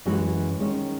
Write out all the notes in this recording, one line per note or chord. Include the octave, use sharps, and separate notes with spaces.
F#2 E3 G#3 C#4 F#4
D#3 G#3 C#4